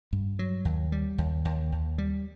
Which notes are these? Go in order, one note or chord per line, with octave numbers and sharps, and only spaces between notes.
G2
F#3
D#2
G3
D#2
D#2
D#2
G3